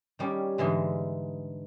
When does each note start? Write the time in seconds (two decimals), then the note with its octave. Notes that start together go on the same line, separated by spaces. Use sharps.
0.19 D#3 G3 C#4
0.58 G#2 D3 E3 G#3